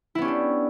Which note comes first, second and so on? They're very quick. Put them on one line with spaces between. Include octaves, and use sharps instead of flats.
E4 B3 C#4 G4 D4